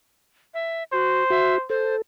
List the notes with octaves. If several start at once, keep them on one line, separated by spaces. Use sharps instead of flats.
E5
F#4 C5
F#4 E5
A4 C5